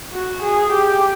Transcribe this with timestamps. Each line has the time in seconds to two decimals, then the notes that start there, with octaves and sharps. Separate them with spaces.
0.13 F#4
0.43 G#4
0.72 G4